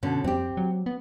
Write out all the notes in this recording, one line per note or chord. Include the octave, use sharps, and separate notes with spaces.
B2 D3 C#4
F2 C4 G4
F#3
B3